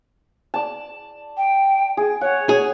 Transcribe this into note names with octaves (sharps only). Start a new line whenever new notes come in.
D5 A5
G5
G#4
C#5 F#5
G#4